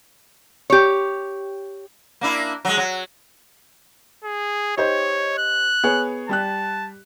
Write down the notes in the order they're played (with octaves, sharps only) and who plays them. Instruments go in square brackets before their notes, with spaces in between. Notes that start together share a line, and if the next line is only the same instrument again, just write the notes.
[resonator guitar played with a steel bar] G4 C#5
[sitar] A#3 D4 E4
F#3 G#3
F#3
[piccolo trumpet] G#4
[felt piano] D#4 G4 C5 [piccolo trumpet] C#5
[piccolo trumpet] F#6
[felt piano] B3 G#4 C#5
[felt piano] G3 G4 F#6 [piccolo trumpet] A5